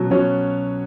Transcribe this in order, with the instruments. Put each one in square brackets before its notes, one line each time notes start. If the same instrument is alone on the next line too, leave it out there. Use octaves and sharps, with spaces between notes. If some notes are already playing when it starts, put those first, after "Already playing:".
Already playing: [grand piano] B2 F#3 C#4 F#4
B2 F#3 C#4 F#4 C#5